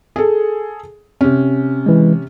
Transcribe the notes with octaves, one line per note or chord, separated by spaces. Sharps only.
G#4 A4
C3 C#4
E3 G#3